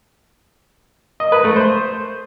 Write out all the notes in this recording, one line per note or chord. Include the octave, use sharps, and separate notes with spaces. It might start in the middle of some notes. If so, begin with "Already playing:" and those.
D#5
B4
A3
C5